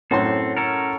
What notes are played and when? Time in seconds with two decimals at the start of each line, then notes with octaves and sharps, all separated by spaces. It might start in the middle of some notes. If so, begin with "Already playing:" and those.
0.11 F#2 A2 C4 A4 C6
0.57 C#4 A4 A#4